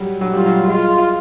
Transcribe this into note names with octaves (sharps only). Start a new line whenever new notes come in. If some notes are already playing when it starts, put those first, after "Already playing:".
Already playing: F#3 G3
F#3
G3 F4
F#3
G#3 F4